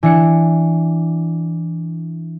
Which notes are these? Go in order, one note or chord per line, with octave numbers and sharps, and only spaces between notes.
E3 D4 C#7